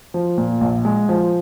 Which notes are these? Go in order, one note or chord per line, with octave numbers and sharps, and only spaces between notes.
F3
A#2
A#1
G#3
F3